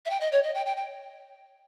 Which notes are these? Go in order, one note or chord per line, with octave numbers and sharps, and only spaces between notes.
E5
G5
D#5
C#5
D#5
G5
G5
G5